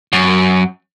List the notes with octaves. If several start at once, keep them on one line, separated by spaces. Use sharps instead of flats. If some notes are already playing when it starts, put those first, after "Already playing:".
F#2